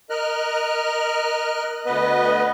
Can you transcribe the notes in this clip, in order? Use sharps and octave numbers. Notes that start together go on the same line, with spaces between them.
A#4 D#5 F6 F#6
D2 B3 B4 D#5